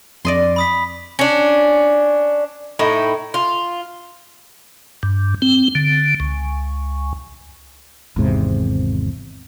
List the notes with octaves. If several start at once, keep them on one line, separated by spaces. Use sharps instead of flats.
F2 D5 D#5 C6
B5 D#6 B6
C#4 D4
A2 D#4 E4
F4
G2
C4
D3
C#2
G#1 E2 G#2 C3